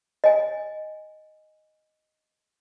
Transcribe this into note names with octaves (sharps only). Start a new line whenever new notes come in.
D#5 G#5